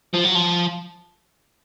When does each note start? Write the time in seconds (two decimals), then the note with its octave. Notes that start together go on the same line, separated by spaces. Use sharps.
0.14 F3
0.24 F#3
0.35 F3